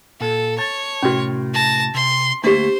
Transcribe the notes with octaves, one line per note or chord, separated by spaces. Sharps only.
A#2 A4
C#5 A5
A2 C3 C#4 F#4 A#4
A5 A#6
C3 C6
D2 A3 A#3 D4 G4 C5